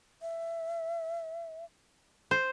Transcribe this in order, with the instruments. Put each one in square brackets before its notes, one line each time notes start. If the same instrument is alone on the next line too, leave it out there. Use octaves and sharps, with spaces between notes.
[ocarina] E5
[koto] C5